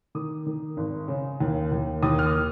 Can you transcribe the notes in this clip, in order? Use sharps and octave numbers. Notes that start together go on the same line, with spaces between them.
D#3 D#6
D#3
G#1
C#3
D#2
D#2
D#2 D#6
F6
D#6